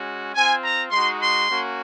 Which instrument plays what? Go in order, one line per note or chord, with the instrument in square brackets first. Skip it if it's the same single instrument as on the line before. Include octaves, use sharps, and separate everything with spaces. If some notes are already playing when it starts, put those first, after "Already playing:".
Already playing: [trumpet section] G#3 C#4 F#4
C4 F4 G#5
A#5
G#3 D#4 F#4 C6
C6
A#3 C#4 F#4